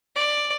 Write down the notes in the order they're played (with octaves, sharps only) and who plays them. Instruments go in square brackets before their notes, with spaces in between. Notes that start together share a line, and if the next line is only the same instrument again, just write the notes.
[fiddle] D5